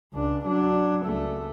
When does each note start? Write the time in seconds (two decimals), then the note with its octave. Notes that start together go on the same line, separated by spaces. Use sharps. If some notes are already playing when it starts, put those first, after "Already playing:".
0.14 C#2 D4
0.46 F#3 D4
1.06 C#2 A3